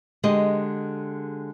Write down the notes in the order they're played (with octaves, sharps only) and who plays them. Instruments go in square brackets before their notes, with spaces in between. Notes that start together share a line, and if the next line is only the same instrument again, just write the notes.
[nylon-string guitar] D3 G#3 G4 D#5